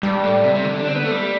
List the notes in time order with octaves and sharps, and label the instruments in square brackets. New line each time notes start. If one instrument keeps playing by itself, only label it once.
[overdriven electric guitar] G2 [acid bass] G3
[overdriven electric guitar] A2
C3
C3
D3
D4
C4
B3
A3
G3